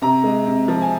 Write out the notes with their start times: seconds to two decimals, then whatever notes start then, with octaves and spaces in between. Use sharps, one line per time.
0.02 C3 A#5
0.24 G#3
0.46 C3
0.68 F3
0.82 G#5